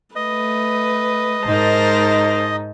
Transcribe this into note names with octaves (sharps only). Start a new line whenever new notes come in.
A3 B4 D#5
G#2 G#3 D#4 A#4 C5 A5